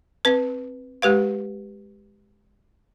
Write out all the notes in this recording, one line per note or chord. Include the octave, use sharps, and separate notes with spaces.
C4 B4
G#3 G4 B4 F5